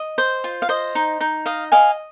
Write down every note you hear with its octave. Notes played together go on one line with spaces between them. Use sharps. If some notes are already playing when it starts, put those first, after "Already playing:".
Already playing: D#5
C5
F4
F5
C5 D#5
D#4
D#4
D#5 F5
D#5 F5 G#5